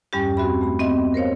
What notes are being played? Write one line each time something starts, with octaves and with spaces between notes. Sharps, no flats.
E2 G2 G3 C#4 G4
C4 F#4 E5 B5
A3 B5
B3 C4 D#5 E5
A#4 C5 C#5 F5